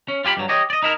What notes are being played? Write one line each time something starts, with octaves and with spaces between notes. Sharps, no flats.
C#4
F4 G4 G#5 B5
G2 F#3
G4 C#5 D#5
D5 D#5
D#4 E4 A#4